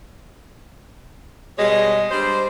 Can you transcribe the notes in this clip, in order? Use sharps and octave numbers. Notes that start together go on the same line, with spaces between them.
B2 G3 G#3 C#5 D#5
G3 D4 C5